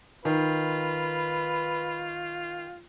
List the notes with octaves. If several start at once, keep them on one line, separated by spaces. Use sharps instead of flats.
D#3 F4 B4